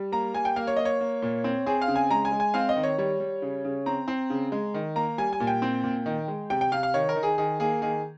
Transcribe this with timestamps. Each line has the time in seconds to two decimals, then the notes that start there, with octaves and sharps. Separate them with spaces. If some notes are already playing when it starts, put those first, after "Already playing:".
Already playing: G3
0.12 A#3 A#5
0.34 G3 G#5
0.45 G5
0.56 A#3 F5
0.67 C#5
0.77 A#3 D#5
0.85 C#5
1.01 A#3
1.22 A#2
1.44 C4
1.66 C4 G#4
1.82 F5
1.88 C#3
1.96 G#5
2.11 G#3 A#5
2.25 G#5
2.32 G#3
2.40 G#5
2.54 C4 F5
2.69 D#5
2.76 D#3
2.83 C#5
2.98 G3 C#5
3.20 G3
3.42 C#3
3.64 C#3
3.86 C4 A#5
4.08 C4
4.30 C#3
4.52 G#3
4.74 D#3
4.96 A#3 A#5
5.18 G3 G#5
5.33 G#5
5.40 A#2
5.47 G5
5.62 C4
5.84 A#2
6.06 D#3
6.28 G#3
6.50 C3 G5
6.61 G5
6.72 C3 F5
6.83 F5
6.94 D#3 C#5
7.09 A#4
7.15 D#3
7.23 G#4
7.38 D#3 G#4
7.60 A#3 G#4
7.82 D#3 G#4